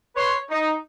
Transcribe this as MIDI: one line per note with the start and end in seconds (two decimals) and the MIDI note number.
0.16 0.37 71
0.16 0.37 73
0.16 0.37 84
0.50 0.73 63